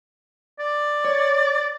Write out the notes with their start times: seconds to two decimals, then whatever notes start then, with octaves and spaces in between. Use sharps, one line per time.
0.60 D5
1.05 C#5